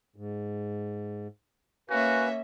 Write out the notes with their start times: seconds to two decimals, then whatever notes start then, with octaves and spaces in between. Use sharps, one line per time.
0.16 G#2
1.90 A#3 C#4 F#4 B4 E5 F5 G#5